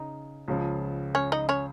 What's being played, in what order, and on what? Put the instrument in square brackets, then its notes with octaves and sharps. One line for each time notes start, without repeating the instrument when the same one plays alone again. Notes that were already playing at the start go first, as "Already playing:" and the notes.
Already playing: [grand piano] C#3 [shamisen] D#4
[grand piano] C#2 C#3 F3
[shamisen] C#4 C#5
D#4 D#5
C#4 C#5